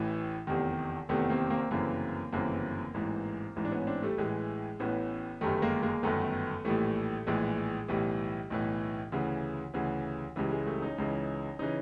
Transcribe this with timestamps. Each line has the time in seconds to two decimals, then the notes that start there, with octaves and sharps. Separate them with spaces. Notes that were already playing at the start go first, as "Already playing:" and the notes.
Already playing: A1 A2 E3
0.47 F1 E2 C3 D#3
1.09 F1 E2 C3 D#3 A3 B3
1.30 A#3 C4
1.50 A#3 C4
1.71 G1 F#2 C#3 E3 A#3 C4
2.32 G1 F#2 C#3 E3 A#3 C4
2.94 A1 G#2 E3
3.56 A1 G#2 E3
3.65 D4
3.72 B3 C#4
3.87 C4 D4
4.02 G3 A3
4.18 A1 A2 E3 G#3
4.80 A1 A2 E3 B3 C#4
5.41 G1 F#2 D#3 G3 A3
5.62 G#3 A#3
5.83 G#3 A#3
6.03 G1 F#2 D#3 A3 B3
6.65 A#1 A2 E3 G3 A3
7.27 A#1 A2 E3 G#3
7.88 B1 A2 E3 G3
8.50 B1 A2 E3
9.12 D2 C#3 E3
9.74 D2 C#3 E3
10.36 C#2 C#3 E3 G3
10.51 G#3
10.66 G3 A3
10.82 C#4 D#4
10.98 C#2 C#3 E3
11.59 C#3 E3 C#4 D#4